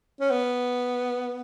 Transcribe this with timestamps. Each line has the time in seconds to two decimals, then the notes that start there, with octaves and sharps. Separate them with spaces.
0.20 C#4
0.30 B3